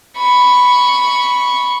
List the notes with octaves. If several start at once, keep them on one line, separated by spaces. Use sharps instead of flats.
B5 C#6